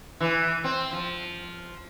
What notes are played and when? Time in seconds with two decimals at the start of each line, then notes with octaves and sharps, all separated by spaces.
0.20 E3
0.64 C4
0.93 F3